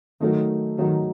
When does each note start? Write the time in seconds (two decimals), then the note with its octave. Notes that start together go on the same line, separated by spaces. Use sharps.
0.21 D#3 F#3 A3 D#4
0.78 D#3 F#3 A3 D#4